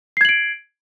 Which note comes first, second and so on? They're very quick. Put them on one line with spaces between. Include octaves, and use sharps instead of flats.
C7 G#6 F#7 D7